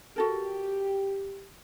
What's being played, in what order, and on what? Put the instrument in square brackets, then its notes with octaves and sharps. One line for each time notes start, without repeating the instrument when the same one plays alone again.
[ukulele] F#4 A4 A#4 [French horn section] G4